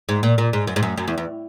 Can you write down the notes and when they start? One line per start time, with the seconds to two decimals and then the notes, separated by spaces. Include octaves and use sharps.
0.09 G#2
0.23 A#2
0.38 A#2
0.53 G#2
0.67 F#2
0.76 G#2
0.83 F#2
0.98 F#2
1.08 E2
1.18 E2